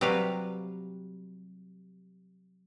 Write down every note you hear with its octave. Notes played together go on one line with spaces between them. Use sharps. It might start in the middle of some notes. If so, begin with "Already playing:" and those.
C3 F#3 G3 G4 B4 F5